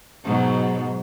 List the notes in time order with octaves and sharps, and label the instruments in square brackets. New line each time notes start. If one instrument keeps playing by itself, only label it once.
[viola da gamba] G#2 B2 F#3